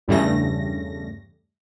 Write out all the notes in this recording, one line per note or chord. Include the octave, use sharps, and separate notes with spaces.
E2 G2 C#3 G3 A3 A#6